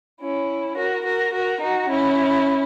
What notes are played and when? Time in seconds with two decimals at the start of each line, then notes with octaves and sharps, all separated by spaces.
0.20 C#4 E4
0.77 F#4 A#4
1.05 F#4 A#4
1.33 F#4 A#4
1.61 D#4 F#4
1.90 C#4 E4